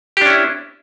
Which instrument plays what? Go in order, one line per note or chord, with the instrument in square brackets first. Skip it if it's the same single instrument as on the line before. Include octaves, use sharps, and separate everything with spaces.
[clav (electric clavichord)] G4
D4
C#4
E4